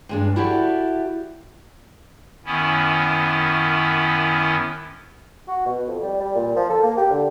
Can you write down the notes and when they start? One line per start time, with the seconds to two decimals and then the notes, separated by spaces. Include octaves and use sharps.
0.09 G2 G#3 D4
0.36 E4 F#4 G4 A4 D5 E5
2.45 F#2 D#3 B3 C#4 E4
5.48 F#4
5.66 B2
5.87 F2
6.02 G3
6.20 G3
6.35 A#2
6.56 F3
6.70 A4
6.83 A#3
6.97 G4
7.10 D3